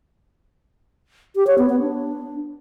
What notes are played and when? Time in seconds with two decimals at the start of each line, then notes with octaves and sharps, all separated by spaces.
1.36 G4
1.47 C#5
1.58 B3
1.69 B3
1.81 D4